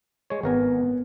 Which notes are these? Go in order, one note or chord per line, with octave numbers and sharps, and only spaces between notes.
G#3 C#5
G#1 B3 A#4 G#5